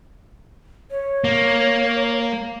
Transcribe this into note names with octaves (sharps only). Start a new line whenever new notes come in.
C#5
A#3